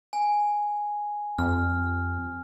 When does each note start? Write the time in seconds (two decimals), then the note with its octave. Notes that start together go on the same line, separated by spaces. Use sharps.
0.13 G#5
1.38 F2 C4 F6